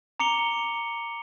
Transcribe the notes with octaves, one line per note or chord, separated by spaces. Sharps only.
A#5 D6 C#7 F7 G7